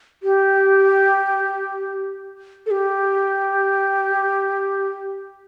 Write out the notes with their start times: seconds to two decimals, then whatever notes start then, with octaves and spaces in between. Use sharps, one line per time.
0.23 G4
2.66 A4
2.71 G4